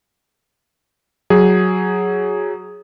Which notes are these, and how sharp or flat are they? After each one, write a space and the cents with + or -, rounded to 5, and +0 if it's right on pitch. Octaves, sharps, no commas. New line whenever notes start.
F#3 +0 G#4 +0